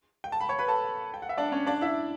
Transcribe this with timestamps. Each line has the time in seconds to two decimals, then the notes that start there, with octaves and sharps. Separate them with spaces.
0.24 G5
0.32 A5
0.41 B5
0.49 C#5 C#6
0.59 B4 B5
0.68 A4 A5
1.14 G5
1.22 F#5
1.29 E5
1.38 D4 D5
1.52 C#4 C#5
1.67 D4 D5
1.81 E4 E5